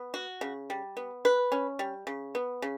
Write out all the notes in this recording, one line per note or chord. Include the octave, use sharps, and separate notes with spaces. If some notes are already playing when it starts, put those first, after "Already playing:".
Already playing: B3
F#4
C#3
G3
B3
B4
C#4
G3
C#3
B3
C#3